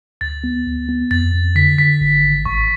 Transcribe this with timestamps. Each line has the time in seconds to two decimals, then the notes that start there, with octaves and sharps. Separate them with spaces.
0.21 D2 A6
0.44 B3
0.66 D2
0.89 B3
1.11 F2 A6
1.33 F2
1.56 D3 B6
1.78 D3 B6
2.01 G#1
2.24 G#1
2.45 A1 C#6